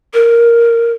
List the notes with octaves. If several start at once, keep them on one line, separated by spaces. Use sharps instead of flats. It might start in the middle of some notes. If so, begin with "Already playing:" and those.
A#4